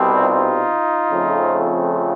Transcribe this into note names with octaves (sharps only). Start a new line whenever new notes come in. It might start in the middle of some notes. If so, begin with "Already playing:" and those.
Already playing: C2 B2 G3 C4
D#4 F4
F2 C#3 F3 A3 C4